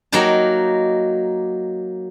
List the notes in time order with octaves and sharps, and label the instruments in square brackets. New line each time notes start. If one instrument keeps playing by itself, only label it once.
[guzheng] F#3 A#3 D#4 G5 A5